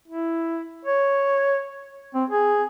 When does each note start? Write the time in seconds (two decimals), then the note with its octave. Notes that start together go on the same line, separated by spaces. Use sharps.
0.08 E4
0.85 C#5
2.14 C4
2.30 G#4